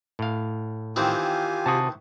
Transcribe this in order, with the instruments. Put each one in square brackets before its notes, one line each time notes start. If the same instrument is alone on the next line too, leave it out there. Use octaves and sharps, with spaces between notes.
[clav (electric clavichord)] A2 F5
[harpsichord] D#3 E3 C4 [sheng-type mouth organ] F4 G4 G#5
[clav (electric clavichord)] C3 F#4 [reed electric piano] A5 D#6